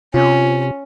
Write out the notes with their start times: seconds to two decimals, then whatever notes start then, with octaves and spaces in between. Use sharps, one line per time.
0.14 C3 C#4 F4